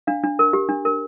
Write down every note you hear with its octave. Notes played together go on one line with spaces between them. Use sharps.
D4 F5
D4
A#4
G4
D4
A#4